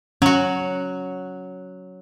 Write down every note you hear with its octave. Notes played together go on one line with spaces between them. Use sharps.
F#3 C#4 F#4